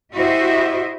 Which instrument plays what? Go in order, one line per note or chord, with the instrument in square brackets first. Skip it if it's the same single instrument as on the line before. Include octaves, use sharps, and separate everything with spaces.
[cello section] E4 F#4 G4 C5 D#5 E5